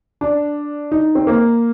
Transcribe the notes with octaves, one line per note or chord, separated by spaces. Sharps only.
D4
D#4
C4
A#3